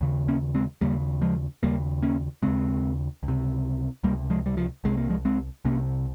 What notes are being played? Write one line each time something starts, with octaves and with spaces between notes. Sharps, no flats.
D#2 C#3
A#3 C#4
G#3 C4
D#2 C#3 G3 A#3
F3 G#3
D#2 C#3 G3 A#3
A#3 C#4
D#2 C#3 G#3 C4
C#2
C3
C#2 C3 G3 A#3
F3 G#3
G3
F3
C2 C3 G#3
A#3
F3 G#3
G#3 C4
C2 C3 A#3 C#4